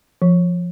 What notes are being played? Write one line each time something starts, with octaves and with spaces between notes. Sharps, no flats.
F3